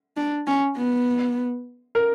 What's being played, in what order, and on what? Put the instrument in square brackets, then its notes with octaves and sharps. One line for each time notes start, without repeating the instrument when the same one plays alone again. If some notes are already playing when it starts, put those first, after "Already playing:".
[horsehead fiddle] D4
C#4
B3
[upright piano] A#4